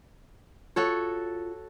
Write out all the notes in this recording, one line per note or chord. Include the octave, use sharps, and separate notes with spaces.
F4 F#4 A4 C#5